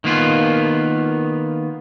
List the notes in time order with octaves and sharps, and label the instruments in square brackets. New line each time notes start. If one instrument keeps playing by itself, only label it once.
[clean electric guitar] D#3 A#3 B3 F4